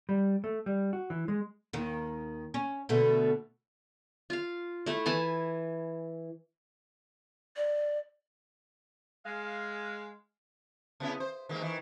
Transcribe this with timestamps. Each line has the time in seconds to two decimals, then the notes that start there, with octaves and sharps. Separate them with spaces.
0.09 G3
0.44 A3
0.66 G3
0.93 F#4
1.10 E3
1.28 G#3
1.73 D#2 D#3
2.54 C#4
2.89 B2 D3 A3
4.30 F4 F5
4.86 A3 E4
5.06 E3 G#5 A5
7.56 D5
9.26 G#3 F5
11.00 C3 B3 E4
11.20 C5
11.49 D#3 G#3 A#3
11.61 D#3 E3